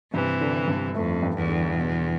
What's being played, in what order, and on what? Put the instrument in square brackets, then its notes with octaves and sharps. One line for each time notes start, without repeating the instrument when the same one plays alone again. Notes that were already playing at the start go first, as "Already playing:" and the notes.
[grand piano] G2 [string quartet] C3 E3
[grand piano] D3
G2
[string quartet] F2 [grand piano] A3
[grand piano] G2
[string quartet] E2
[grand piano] D3
B2